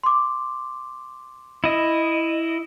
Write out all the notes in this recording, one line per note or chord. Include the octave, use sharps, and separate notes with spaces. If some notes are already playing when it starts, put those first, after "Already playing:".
C6 D6
E4 D#5